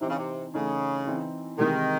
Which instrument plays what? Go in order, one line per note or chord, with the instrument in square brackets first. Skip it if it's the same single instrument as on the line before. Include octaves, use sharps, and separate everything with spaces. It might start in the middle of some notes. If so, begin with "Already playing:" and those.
[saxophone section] C3 [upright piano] E3 C4 D#4
[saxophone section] C#3
C3
[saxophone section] C#3 [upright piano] E3 A3 D#4
[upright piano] E3 C4 D#4
[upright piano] C3 E3 G#3 D#4 [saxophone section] D#3